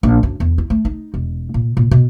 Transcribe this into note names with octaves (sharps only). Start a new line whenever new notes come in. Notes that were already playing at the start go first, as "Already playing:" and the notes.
A#1
F#2
E2
E4
A3
D#4
E1
A#2
A#2
B2